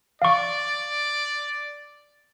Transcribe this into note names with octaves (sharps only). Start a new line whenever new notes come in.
D5 F5 C#6